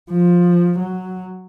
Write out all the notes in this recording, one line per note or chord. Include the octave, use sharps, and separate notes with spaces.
F3
F#3